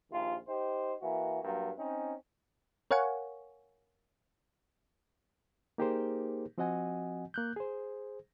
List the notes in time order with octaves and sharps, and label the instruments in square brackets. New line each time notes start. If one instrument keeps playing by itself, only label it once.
[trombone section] A#1 D#2 F4
D#4 G4 C5
E3 A#3 F#4
G2 F#3 A#3
C4 C#4 D#4
[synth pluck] A#4 C#5 F5 F#5 G#5 C#6
[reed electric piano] A#3 D#4 G4 G#4 A#4 C5
F3 C4 F#4 D#5 F#5 G#5
A#3 F#6 G6
G#4 C5